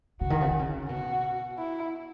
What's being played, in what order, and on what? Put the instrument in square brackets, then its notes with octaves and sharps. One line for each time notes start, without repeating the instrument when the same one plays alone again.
[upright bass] C#3 [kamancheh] F#4
[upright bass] D#3
C#3
D#3
C#3
[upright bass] B2 [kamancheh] F#4
[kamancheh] E4